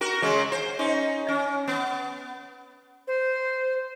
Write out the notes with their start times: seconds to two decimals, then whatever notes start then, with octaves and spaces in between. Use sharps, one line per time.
0.01 F#4 A#4
0.22 C#3 F#3 G#3
0.52 C5
0.79 C#4 D#4
1.29 C#4
1.68 B3
3.07 C5